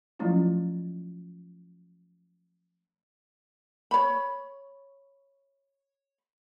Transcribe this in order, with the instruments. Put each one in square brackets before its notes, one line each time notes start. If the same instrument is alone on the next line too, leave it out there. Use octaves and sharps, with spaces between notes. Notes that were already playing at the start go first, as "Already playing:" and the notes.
[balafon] F3 F#3 A3 C#4 E4 F4
[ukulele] C#5 B5